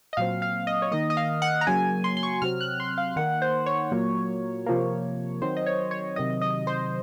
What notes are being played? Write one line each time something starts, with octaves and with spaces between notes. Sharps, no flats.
D#5
A#2 F#3 C4 F5
F5
D#5
C#5
D#3 A#3 D#5
D#5
F5
F#5
A#5
C#3 F#3 A#3 G#5
C6
C6
C#6
C3 F#3 C4 F6
F#6
C6
F5
D#3 A#3 F#5
C5
C#5
A#2 F#3 A#3
C3 F3 A#3
D#3 F#3 C4 C5
D#5
C#5
C#5
C3 D#3 F#3 D#5
D#5
C5